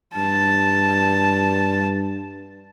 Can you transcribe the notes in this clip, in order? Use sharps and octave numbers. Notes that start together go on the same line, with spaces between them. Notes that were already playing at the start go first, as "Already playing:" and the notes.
G2 A5